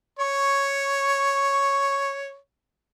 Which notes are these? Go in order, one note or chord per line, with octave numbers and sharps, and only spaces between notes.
C#5 C#6